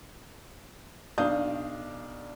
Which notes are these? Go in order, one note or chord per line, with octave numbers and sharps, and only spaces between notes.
B1 D4 F5 D#6 G6